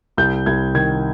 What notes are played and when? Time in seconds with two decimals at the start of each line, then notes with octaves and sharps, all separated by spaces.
0.17 C2 G6
0.46 C2 G#6
0.75 D#3 G#6